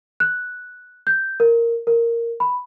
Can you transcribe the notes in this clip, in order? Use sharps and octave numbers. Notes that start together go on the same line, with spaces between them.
F#6
G6
A#4
A#4
B5